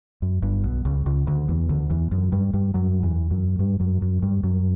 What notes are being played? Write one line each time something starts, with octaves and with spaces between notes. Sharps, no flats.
F#2
G1 G2
B1 B2
C#2 C#3
C#2 C#3
D2 D3
E2 E3
D2 D3
E2 E3
F#2 F#3
G2 G3
G2 G3
F#2 F#3
E2 E3
F#2 F#3
G2 G3
F#2 F#3
F#2 F#3
G2 G3
F#2 F#3